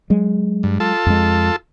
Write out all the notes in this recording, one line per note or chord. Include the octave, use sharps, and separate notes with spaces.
F#3 G#3
G2
F4 A4 A5
F2 G#3